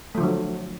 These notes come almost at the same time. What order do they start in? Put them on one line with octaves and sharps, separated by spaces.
A3 F3 D3 F#3